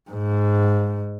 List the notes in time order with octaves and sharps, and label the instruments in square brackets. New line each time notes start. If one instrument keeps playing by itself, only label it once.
[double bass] G#2